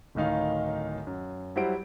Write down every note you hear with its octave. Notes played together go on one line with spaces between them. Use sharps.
D1 A2 D#3 D#4 F5
F#2
F#3 G3 E4 C5 F#5 D7